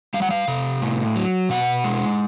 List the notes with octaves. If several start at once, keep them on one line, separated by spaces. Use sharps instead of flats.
G3 F5
F#5
F5
C3
A2
F#3
B2 F#5
G#3